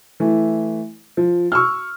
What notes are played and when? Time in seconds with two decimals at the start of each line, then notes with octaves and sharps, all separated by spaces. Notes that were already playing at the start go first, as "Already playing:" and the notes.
0.20 E3 A3
1.17 F3
1.52 C#6 E6 F6